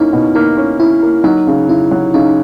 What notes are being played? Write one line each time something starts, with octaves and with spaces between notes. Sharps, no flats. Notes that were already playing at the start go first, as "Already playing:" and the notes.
Already playing: A#3 C#4 D#4 E4
B2
A#3 D#4
C#4
C#4 E4
A#3
F#3 D#4
C#3
C#3 E4
F#3
C#3 D#4